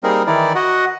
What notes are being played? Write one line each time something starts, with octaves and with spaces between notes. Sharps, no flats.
G3 A#3 C4 D#4 G#4 A#4
D#3 E3 D#4 E4 D5
F#4 D#5 F#5